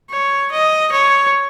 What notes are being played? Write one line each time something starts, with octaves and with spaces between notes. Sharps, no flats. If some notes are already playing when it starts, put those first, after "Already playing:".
C#5
D#5
C#5